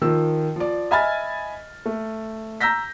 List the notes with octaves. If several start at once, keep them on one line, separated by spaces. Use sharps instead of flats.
D#3 F3 E6
F3 D5
D#5 E5 G#5 B5 F6 A6
A3
A#5 E6 G6 A#6 B6